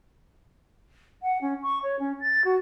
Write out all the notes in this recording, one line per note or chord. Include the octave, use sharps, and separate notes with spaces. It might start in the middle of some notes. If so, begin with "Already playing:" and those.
F#5
C#4
C#6
C#5
C#4
A6
F#4